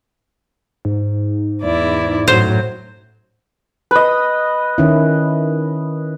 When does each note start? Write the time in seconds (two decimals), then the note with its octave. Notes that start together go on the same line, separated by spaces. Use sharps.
0.85 G#2
1.63 E2 E4 D5
2.28 F#2 A2 F#3 C5
3.91 B4 D#5
4.78 D#3 C#4 E4